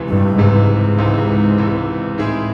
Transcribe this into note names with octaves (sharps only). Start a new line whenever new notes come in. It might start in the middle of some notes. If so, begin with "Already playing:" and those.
Already playing: C#2 C3 E3
G2
C#2 G#2 C3 E3
C#2 C3 E3
C#2 C3 E3
A2 D#3 G#3 C4 E4 G#4